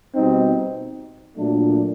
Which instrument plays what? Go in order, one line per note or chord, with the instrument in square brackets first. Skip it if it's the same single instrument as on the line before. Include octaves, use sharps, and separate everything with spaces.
[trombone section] B2 G3 C4 D#4
A#2 F#3 A3 D4